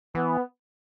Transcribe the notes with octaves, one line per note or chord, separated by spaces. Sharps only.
E3 B3